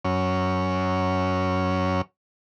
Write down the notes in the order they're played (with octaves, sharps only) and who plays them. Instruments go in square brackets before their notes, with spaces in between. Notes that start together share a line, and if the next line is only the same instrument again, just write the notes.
[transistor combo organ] F#2 C#4